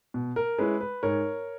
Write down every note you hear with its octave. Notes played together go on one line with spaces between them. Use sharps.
B2
A#4
G#3 C#4 E4 B4
B4
G#2 A#4 C#5